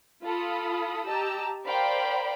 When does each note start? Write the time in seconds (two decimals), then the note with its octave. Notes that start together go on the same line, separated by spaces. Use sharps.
0.23 F4 A4 B5 D#6
1.06 G4 D#5 A5 A#5 E6
1.65 A#4 C5 D5 F5 G5 B5